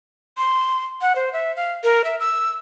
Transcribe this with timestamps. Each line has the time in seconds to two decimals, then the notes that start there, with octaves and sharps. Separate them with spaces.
0.38 C6
1.02 F#5
1.16 C5
1.33 E5
1.56 F5
1.84 A#4
2.05 E5
2.20 E6